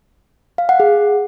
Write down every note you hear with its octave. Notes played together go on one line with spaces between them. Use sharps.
F5
F#5
G#4